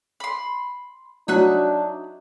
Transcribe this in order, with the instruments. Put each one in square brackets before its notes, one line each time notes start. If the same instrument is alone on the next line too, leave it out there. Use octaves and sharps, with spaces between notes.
[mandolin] B5 C6
[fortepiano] F#3 [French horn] D4 [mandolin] D#4 E5 F#6